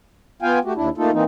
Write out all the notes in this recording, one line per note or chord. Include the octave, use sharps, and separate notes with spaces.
B3 F4 F5 G5 G#5
A3 F#4 G4
D#2 D4 E4
A3 A#3 D#4 F4 A4
E3 A#3 C4 D#4